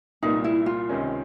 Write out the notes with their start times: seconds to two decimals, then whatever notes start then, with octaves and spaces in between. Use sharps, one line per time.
0.23 C2 A#2 G3 A#3 D#4
0.44 E4
0.66 F4
0.89 C#2 C3 D#3 G#3 C#4